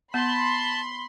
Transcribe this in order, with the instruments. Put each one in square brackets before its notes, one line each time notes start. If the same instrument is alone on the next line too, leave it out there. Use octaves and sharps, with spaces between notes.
[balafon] B3 [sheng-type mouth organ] A5 [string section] B5 C6